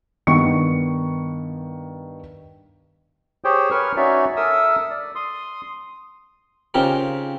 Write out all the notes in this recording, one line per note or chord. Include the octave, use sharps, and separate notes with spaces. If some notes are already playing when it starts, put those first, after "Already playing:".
G2 D#3 B3 C#6 C#7
G4 G#4 C5 C#5 G5
A#4 B4 C#5 C#6 F6
C#4 D#4 F#4 C#5 D5 E5
A4 A#4 E5 D#6 E6
D5
C6 D#6
C#3 C4 D#4 F4 G4 A#4